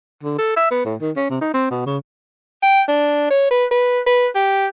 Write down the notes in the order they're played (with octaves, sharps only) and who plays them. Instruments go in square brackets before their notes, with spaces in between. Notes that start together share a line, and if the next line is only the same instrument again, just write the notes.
[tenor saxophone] D3
A4
E5
B3
A2
D#3
C#4
C3
D#4
C4
B2
C#3
[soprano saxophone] G5
D4
C#5
B4
B4
B4
G4